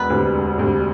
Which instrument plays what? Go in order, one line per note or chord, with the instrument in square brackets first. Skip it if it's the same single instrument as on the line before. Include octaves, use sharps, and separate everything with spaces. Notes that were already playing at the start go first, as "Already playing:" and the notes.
Already playing: [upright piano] E1 [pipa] B3 B4
[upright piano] D2 C3
E1
D2 C3